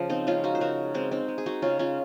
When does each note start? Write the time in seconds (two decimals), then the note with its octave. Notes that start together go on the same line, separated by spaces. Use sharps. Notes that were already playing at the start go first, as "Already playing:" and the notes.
Already playing: C#3 F3
0.10 C4 D#4
0.27 G#3 C#4 F4
0.44 D#4 F#4
0.55 C5
0.60 C#3 F#4 A#4
0.94 G#3 C4
1.11 C4 D#4
1.28 G#3
1.38 G#4
1.46 D#4 F#4
1.62 C#3 C#4 F4
1.79 C#4 F4